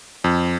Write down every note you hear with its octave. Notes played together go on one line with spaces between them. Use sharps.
F2